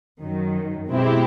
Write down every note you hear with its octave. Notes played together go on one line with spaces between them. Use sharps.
F#2 D#3 F#3
B2 G#3 C4 E4 G4